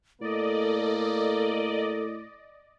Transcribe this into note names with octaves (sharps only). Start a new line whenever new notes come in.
A2 A#3 A4 D5 D#5